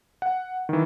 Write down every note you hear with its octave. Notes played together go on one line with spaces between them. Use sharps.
F#5
D#3 E3